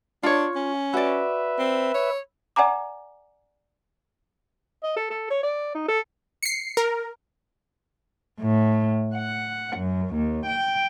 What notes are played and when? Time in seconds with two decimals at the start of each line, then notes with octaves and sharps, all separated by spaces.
0.23 D4 F4 C#5
0.56 C#4
0.94 F#4 B4 D5 E5
1.59 C4
1.94 C#5
2.56 D5 F#5 G#5 A#5 D6
4.83 D#5
4.96 A4
5.10 A4
5.30 C#5
5.43 D5
5.74 D#4
5.88 A4
6.43 C7 C#7
6.77 A#4
8.40 A2
9.14 F#5
9.77 F#2
10.14 D#2
10.48 G5